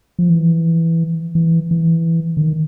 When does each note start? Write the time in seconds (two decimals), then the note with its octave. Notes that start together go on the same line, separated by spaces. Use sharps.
0.19 F3
0.30 E3
1.35 E3
1.71 E3
2.37 D3
2.40 D#3